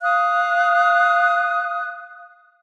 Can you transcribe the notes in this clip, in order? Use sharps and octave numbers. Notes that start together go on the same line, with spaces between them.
F5 D#6 F#6